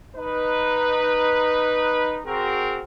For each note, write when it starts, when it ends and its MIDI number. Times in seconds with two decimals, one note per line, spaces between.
0.16 2.19 63
0.16 2.19 71
2.26 2.82 60
2.26 2.82 66
2.26 2.82 68
2.26 2.82 70